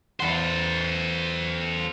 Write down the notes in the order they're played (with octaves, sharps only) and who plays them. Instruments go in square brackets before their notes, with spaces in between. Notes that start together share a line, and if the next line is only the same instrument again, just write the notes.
[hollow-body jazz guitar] E2 F#5 [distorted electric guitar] A4 C5